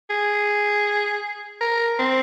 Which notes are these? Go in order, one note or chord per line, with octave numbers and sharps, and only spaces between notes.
G#4
A#4
C4